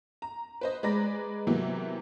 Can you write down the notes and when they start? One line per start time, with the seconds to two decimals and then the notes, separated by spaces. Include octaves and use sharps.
0.22 A#5
0.61 B4 C5 D#5
0.83 G#3 B4 D5 A#5 B5 A#6
1.47 C3 E3 F#3 A#3 B3